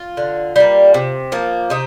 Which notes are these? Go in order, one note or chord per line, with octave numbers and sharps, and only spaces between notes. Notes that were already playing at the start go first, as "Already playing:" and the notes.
Already playing: F4
D3
G3 A#3
C3
F3 A#3
C3 D#4